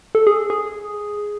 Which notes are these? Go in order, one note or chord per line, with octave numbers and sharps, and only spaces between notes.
A4
G#4
G#4